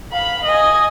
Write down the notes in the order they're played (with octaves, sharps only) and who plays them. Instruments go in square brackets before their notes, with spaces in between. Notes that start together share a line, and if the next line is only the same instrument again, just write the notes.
[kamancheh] F5 B5
D#5 G#5